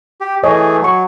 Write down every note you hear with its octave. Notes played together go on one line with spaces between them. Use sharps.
G4
E3 A3 G#4 C#5 D#5
F#3 G#5 C#6